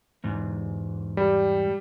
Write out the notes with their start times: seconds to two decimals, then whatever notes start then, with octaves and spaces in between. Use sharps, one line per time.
0.24 E2 G#2
1.17 G3